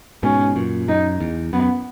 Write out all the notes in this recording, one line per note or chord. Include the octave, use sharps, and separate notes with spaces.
G#2 B2 C#4
F#2 A#2
F#2 D#4
E2
F#2 B3